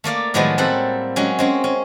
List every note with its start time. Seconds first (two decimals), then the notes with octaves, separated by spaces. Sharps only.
0.04 A3 A#3 D5 F5
0.34 A2 D#3 F3 F#3 G#3 B3
0.58 A2 G3 A#3 C4 A4 F#5
1.16 F#3 G#3 C#4
1.39 G#3 C4 C#4
1.64 C#4